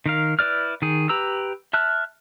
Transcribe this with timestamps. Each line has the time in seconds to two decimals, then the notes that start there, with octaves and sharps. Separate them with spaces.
0.06 D#3 A#4 F5
0.39 E4 B4 D5 F6
0.82 D#3 G#4
1.09 G4 B4 A#5 E6
1.73 E5 A5 F6 F#6